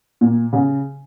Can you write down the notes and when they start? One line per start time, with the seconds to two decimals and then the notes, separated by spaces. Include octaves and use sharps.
0.21 A#2
0.53 C#3